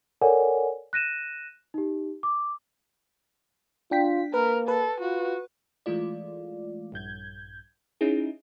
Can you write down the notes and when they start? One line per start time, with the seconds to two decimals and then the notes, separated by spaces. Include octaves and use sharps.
0.21 A4 A#4 C#5 D5 F#5 G#5
0.93 F#6 A#6 D#7 E7
1.74 D#4 G4
2.23 D6
3.91 D4 F4 G5 B6
4.34 A#3 A#4 B4
4.68 A4 B4
5.01 F4 F#4
5.86 E3 G#3 A3 F4 D5
6.92 A#1 G2 G6 G#6
8.01 C#4 D#4 E4 G#4